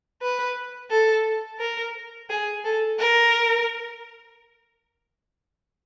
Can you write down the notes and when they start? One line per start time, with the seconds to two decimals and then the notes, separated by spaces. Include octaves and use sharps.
0.22 B4
0.91 A4
1.60 A#4
2.30 G#4
2.65 A4
2.99 A#4